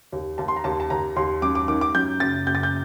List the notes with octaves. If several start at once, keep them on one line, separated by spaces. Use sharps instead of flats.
D#2
D#2 A5
C6
A#5
D#2 A5
A5
D#2 A#5
D#2 C6
F#2 D6
D6
D#3 D6
D6
F#2 G6
F#1 A6
F#1 G6
A6
G6